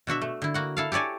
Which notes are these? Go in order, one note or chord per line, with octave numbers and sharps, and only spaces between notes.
B2 D4 F#4 E5
A3
D3 E4
A#3 F#4 F#5
E4 A4 F5
G4 A4 C#5 D5 G#5